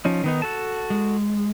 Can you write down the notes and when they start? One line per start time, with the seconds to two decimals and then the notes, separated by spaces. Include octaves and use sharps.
0.05 F3 C#4 D#4
0.24 D#3 B3 D#4
0.42 F#4 A4 A5
0.90 G#3